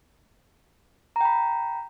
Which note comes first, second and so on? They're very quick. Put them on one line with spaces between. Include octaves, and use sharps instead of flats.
A#5 G5 B5